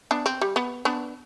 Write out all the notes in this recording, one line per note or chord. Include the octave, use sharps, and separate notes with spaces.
B3 D4
C4
G3
B3
B3 D4